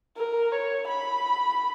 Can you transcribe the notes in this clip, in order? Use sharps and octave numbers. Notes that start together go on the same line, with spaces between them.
A#4
C#5
B5